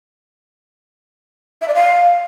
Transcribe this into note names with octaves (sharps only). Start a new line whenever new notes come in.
E5
D5
F5